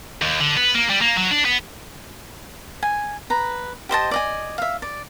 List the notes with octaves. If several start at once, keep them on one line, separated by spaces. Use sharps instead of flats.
D#2
D3
B3
A#3
G3
A#3
F#3
D4
B3
G#5
B4 A#5
G4 C5 D#5 A5
D5 D#5 G#5
E5 F5
D5